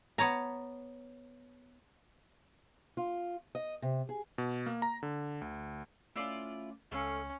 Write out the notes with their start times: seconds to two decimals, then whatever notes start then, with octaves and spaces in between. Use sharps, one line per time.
0.18 B3 C#5 A5 A#5
2.97 F4
3.55 D#5
3.82 C3
4.09 G#4
4.38 B2
4.66 A#3
4.82 A#5
5.03 D3
5.41 D2
6.16 A3 C#4 E4 F4 D5
6.92 C#2 A3 C#4 F5